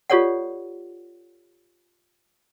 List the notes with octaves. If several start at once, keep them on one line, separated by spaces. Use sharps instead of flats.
F4 G4 A4 C#5 D5 F#5